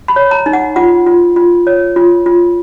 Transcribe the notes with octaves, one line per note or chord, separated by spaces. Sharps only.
B5
C#5
A#5
D#4
F#5
F4 F#5
F4
F4
C#5
F4
F4